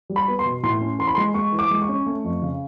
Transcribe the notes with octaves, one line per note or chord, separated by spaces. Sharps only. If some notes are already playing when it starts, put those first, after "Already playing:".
G3
B5
B3
C6
B2
A2 C6
C#4
E3 C6
B5
G#3 C6
G#3 C#6
E3
D6
G#3
C#6
C#4
A3
F2
C#3